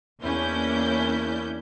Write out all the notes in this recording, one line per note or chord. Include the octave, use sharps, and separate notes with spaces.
E2 A#3 C#4 D4 E4 G6